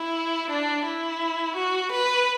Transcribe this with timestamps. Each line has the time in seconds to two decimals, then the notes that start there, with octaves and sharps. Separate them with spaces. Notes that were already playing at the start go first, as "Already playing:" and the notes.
Already playing: E4
0.50 D4
0.85 E4
1.55 F#4
1.91 B4